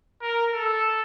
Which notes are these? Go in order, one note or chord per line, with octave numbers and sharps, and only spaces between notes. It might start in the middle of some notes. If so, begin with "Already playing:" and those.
A#4
A4